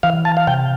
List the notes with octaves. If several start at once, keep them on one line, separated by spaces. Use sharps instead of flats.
E3 F5
A5
F5
C3 G5